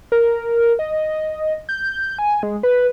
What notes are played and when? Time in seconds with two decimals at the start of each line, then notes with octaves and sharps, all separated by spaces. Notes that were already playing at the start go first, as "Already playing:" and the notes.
0.12 A#4
0.79 D#5
1.69 G6
2.19 G#5
2.43 G#3
2.63 B4